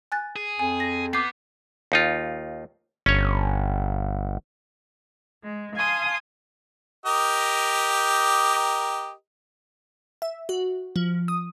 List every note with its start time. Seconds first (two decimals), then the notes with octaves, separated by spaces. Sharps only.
0.12 G#5 F#6 A6
0.36 G#4
0.59 F2 G#5
0.80 A#6
1.13 B3 D6 G6 C7
1.92 D#2 D#4 F4
3.06 G1 C#4 C#5
5.43 G#3
5.74 F5 G#5 A5 C6 D#6
7.06 G4 A#4 D#5
10.22 E5
10.49 F#4
10.96 F3
11.28 D#6